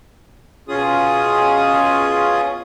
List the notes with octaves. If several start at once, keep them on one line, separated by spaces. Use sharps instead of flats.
B2 C#4 F4 G#4 D#6